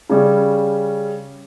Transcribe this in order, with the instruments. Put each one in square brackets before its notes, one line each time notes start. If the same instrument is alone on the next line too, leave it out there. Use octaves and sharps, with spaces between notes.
[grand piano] C#3 G3 C#4